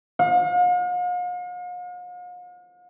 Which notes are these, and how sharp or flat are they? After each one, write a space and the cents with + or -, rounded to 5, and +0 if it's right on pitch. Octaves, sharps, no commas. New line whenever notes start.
F5 +45